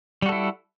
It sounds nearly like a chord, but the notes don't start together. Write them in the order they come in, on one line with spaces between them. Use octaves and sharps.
G3 F#4 A4 E4